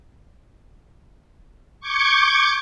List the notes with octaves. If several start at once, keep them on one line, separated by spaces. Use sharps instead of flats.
C#6 D6 G6 G#6 C#7